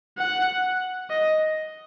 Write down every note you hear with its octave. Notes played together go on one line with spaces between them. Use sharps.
F#5
D#5